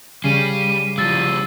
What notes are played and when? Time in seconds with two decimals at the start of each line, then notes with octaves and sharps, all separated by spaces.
0.24 C#3 G3 C7 D#7
0.98 F3 G3 E6 A6